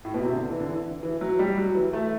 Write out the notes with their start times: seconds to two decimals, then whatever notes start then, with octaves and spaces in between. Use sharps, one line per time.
0.05 A2
0.14 B2
0.23 C3
0.32 D3
0.50 E3
0.60 D3
0.68 E3
1.03 E3
1.21 F#3
1.39 G3
1.58 F#3
1.75 E3
1.93 A3